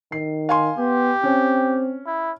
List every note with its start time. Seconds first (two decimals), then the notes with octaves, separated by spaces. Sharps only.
0.12 D#3 C7
0.49 F5 G#5 C6
0.78 B3 G4
1.23 C4 C#4
2.06 E4